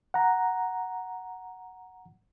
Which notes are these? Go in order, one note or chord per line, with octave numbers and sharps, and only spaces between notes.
F#5 A#5